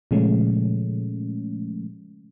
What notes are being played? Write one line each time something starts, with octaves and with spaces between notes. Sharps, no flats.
A#2 C#3 F3 G#3 A3 C#4